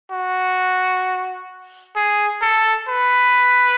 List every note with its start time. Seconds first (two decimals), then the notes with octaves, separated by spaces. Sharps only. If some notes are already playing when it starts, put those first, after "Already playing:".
0.11 F#4
1.96 G#4
2.42 A4
2.89 B4